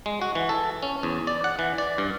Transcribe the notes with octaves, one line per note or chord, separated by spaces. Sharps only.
G#3
F#4
E3
A4
C#4
E2
D5
F#5
E3
D5
G2